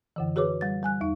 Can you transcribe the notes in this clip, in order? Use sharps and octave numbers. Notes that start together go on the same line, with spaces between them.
F#2 D3 E3
F#4 G#4 B4 C#5 D6
G3 A6
G3 G#5 F#6
E2 D#4